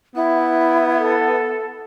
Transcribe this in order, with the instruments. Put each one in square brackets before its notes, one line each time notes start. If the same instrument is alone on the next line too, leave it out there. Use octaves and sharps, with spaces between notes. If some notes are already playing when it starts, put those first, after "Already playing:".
[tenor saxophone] B3 [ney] E4
[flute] A4